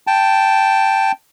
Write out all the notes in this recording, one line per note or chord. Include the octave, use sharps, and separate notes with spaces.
G5 A5